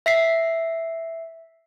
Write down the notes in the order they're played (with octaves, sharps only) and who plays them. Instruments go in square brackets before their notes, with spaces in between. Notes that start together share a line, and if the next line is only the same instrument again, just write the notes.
[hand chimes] E5 B6 C7